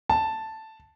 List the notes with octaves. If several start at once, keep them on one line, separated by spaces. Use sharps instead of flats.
A5